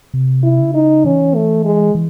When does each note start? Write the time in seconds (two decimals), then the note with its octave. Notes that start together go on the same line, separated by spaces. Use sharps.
0.14 C3
0.43 E4
0.59 C#3
0.74 D#4
1.05 E3 C#4
1.35 A3
1.65 G#3
1.95 E3